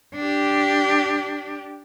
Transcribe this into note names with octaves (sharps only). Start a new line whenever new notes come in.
D4 G4